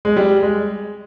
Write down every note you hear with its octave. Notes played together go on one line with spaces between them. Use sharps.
G#3
G3
G#3